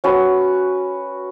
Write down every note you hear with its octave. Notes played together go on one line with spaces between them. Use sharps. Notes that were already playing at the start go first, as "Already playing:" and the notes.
C#4 F#4 B4